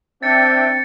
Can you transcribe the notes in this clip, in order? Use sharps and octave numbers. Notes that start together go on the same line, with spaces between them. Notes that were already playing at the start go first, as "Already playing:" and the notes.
C4 D4 E5 G5 A6 C#7